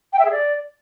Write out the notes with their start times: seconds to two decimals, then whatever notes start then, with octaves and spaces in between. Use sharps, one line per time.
0.13 G5
0.19 E5
0.25 G#4
0.31 D5